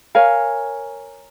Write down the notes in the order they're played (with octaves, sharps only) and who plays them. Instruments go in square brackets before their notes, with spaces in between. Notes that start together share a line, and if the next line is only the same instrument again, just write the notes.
[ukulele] A#4 C#5 F5 G#5